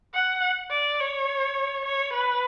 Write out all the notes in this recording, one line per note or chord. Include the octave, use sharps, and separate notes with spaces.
F#5
D5
C#5
C#5
B4